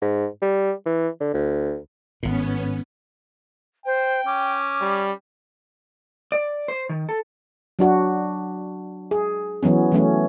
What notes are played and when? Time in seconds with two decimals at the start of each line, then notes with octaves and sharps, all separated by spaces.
0.02 G#2
0.42 G3
0.86 E3
1.20 D3
1.34 D2
2.23 G#1 A2 B3 C#4
3.86 C5 G5
4.26 C#4 D6
4.81 G3
6.32 D5
6.68 C5
6.89 D#3
7.09 A4
7.79 F#3 D4 F#4
9.11 G#4
9.63 E3 F#3 B3 C#4
9.92 E3 F#3 A3 C#4